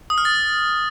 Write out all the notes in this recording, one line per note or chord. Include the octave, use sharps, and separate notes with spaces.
D#6
F6
A6